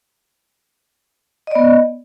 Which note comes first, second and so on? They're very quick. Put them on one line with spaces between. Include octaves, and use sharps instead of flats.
D#5 D5 B3